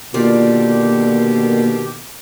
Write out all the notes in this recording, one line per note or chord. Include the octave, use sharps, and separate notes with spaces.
B2 D3 D#3 A#3 F4 G4 D5